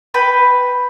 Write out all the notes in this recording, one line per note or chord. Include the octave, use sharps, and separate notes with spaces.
B4 G5 B5